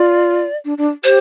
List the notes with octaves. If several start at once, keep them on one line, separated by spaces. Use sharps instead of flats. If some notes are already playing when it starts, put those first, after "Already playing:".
Already playing: F4 D5
D4
D4
G4 C5